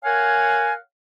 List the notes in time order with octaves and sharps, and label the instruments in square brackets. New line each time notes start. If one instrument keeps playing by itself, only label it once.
[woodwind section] A#4 C#5 F5 F#5 G#5